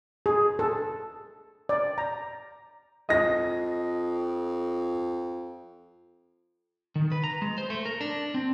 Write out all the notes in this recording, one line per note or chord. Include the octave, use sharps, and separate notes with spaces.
G#4
A4
D5
A#5
F2 D#5 A#6
D#3
B4
A#5
G#3
C5
A3
A#4
D4
C4